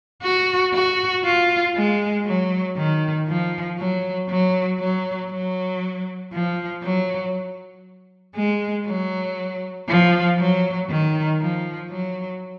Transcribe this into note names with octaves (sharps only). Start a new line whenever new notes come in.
F#4
F#4
F4
G#3
F#3
D#3
F3
F#3
F#3
F#3
F#3
F3
F#3
G#3
F#3
F3
F#3
D#3
F3
F#3